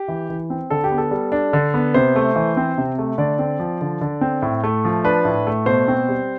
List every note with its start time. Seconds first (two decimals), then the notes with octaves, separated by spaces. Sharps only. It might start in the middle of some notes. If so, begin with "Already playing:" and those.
Already playing: G4
0.08 E3
0.30 E3
0.50 C4
0.70 D3 A4
0.84 G4
0.91 B3
0.98 A4
1.11 G3
1.32 D4
1.53 D3
1.74 B3
1.94 C3 C5
2.16 A3
2.36 E3
2.57 C4
2.78 C3
2.98 A3
3.18 D3 D5
3.39 C4
3.60 F3
3.81 D3
4.01 D3
4.21 C4
4.42 A2
4.63 A3
4.85 F3
5.04 D4 B4
5.25 A2
5.47 A3
5.66 B2 C5
5.88 C4
6.09 G3